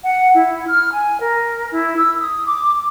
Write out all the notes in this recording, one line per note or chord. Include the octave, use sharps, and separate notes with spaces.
F#5
E4
F6
G#5
A#4
E4
E6
D#6
D6